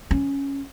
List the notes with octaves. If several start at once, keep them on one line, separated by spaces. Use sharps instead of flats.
C#4